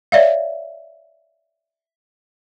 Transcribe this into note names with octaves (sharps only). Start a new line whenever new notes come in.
C#5 D5 E5 F5